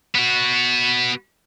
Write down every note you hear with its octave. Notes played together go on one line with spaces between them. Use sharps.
B3 F#4